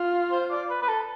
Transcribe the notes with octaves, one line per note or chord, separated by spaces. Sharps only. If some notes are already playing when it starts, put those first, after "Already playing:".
Already playing: F4
C5
D5
B4
B4
A4